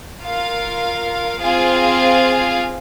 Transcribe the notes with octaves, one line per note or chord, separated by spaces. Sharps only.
F4 A#4 F5
C4 F4 G#4 F5 G#5